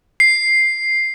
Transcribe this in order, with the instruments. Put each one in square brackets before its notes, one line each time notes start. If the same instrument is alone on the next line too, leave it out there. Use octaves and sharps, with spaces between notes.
[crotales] C7